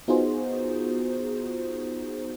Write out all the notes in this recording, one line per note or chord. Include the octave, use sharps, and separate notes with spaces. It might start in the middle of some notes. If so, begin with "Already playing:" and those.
B3 D#4 F4 F#4 G#4 C5